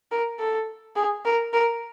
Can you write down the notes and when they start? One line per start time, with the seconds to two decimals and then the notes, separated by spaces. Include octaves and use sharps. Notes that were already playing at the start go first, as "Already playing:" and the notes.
0.11 A#4
0.39 A4
0.96 G#4
1.25 A#4
1.53 A#4